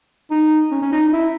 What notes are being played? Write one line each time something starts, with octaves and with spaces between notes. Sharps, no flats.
D#4
C#4
C#4
D#4
D#4
E4